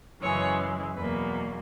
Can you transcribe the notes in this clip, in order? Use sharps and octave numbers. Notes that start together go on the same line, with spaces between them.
F#2 C#3 E3 G#3 C#5
E2 B2 F#3 A#3 B4